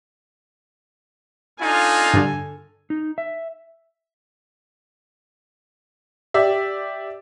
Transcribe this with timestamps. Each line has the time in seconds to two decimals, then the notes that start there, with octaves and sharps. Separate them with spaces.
1.60 D4 D#4 F4 A4 G#5
2.14 G2 D3
2.90 D#4
3.18 E5
6.34 G4 D5 E5